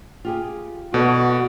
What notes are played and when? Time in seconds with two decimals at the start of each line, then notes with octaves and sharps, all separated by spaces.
0.25 F4 G4 G#4
0.94 B2 B3 F#4 A4 D5